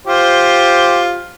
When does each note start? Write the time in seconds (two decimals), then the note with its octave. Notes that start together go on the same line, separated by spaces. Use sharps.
0.07 F4 G4 C5